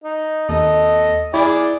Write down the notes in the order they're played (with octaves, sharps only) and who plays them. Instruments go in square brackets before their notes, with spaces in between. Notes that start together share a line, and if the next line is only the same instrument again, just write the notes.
[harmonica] D#4
[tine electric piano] D#2 [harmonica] A4 D#5
[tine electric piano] E4 [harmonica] G#4 D5